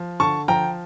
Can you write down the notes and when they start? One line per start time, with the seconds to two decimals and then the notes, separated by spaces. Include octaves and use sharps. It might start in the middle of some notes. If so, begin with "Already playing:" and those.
Already playing: F3
0.20 D3 A5 C#6
0.48 F3 G5 A#5